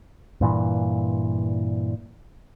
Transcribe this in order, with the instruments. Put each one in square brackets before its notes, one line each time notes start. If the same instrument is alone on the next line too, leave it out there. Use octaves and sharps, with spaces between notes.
[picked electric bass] G2 A#2 E3